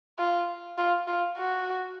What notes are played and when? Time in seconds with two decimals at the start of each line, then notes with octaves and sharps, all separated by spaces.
0.19 F4
0.78 F4
1.07 F4
1.37 F#4